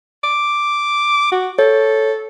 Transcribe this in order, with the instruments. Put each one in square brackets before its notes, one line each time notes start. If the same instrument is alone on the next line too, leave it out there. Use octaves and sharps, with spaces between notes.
[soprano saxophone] D6
F#4
[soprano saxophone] A4 [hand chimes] C#5